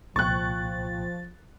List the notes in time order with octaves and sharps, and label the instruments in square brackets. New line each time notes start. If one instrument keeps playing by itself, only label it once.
[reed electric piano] C2 A#2 G5 [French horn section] F3 [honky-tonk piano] C#6 F#6 [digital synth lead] A6